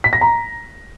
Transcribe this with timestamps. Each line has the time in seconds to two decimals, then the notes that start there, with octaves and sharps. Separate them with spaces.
0.04 B6
0.13 A#6
0.21 A#5